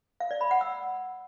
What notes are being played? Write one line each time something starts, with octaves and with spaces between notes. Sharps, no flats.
F5
D5
B5
F#5
E6